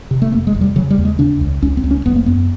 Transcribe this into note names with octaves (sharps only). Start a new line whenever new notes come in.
C3
A3
F1 A#3
G#3
F1
G3
C#3 F#3
G3
D#2
G#3
C#3 D4
C#2
C#2 C#4
C4
C#2
C#4
F#1 B3
A#3
F#2 B3